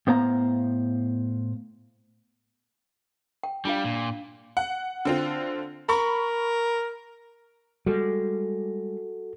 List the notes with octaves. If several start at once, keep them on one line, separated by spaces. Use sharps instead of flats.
A2 B3 C5 F5 A#5
G5
G3 D4 F4 F5
A#2
F#5
D3 C4 F4
A#4 B5 C#6
G3 G#3 F#4 A4